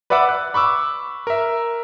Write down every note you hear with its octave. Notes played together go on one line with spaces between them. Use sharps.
B4 D5 E5 F#5 D6 E6
F#6
B5 C#6 D6 E6
A#4 E5